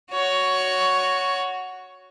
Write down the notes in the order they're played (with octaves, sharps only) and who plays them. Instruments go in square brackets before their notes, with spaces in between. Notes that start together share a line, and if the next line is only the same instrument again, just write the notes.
[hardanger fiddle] F#4 C#5